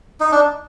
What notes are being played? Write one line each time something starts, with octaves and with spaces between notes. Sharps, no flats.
D#4
D4